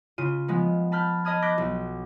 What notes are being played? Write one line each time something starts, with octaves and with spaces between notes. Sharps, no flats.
C#3 F4 D#7
F3 G#3 B3
A5 B5 F6 G6
D#5 A5 B5 D#6 F6 G#6
D6 F#6 G6 A#6 B6
B1